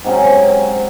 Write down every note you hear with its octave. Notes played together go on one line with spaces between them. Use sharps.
G#2 C3 F#3 C#4